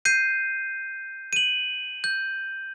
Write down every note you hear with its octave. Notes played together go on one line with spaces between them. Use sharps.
G6 C7 D#7
D#7 F#7
G6